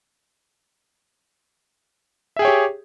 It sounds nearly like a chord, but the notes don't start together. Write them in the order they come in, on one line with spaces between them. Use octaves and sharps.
E5 G#4 G5 C#5 G4